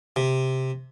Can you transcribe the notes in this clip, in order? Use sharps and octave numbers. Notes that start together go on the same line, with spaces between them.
C3